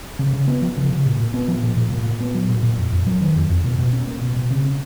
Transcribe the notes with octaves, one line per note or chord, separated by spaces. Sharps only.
C#3
C#3
B3
F3
C#3
C#3
A#2
A#2
B3
F3
A#2
A#2
A#2
A#2
B3
F#3
A#2
A#2
F2
F2
F#3
D#3
F2
F2
B2
B2
C#4
A#3
B2
B2
C#3
C#4